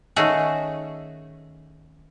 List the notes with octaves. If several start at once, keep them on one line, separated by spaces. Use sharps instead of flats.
D#3 A3 C#4 F#4 G#4